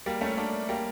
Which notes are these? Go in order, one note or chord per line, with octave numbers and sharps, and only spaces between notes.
G3 A#3
A3 C#4
A#3 D4
G3 A#3